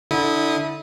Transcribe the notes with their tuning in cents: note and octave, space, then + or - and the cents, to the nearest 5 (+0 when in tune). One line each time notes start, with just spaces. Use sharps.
D3 +0 E4 -25 D#6 -5